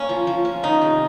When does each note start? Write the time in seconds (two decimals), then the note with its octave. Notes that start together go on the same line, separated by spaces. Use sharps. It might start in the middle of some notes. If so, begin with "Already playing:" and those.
Already playing: A#3 C#4
0.09 F3
0.27 F3
0.45 C#4
0.63 D#3 D#4
0.82 C3